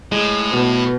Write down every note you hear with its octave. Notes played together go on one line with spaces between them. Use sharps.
A2 G#3
B2 B4